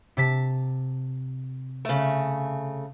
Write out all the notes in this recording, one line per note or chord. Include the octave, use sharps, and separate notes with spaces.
C3 A5 B6
C#3 A3